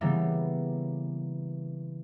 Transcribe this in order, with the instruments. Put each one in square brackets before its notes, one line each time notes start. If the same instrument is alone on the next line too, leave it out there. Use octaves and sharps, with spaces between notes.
[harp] C#3 E3 G3 A#3 B3